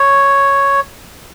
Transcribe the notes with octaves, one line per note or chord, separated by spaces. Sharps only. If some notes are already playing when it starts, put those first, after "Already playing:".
Already playing: C#5